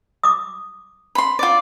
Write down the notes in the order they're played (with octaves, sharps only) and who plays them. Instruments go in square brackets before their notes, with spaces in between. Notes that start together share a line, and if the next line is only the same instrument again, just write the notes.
[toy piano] D6 D#6
[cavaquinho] B5 C6
F4 D5